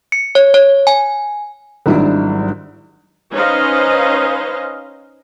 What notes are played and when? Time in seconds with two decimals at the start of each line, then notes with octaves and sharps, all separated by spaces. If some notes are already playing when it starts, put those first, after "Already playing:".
0.12 C#7
0.35 C#5
0.54 C#5
0.87 G#5
1.86 G#1 G#2 F#3 G3 D4 E4
3.33 C#4 D#4 B4 C5 D#5 F5